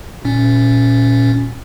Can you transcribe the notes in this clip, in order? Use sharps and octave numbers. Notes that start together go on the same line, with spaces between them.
A#2 C#4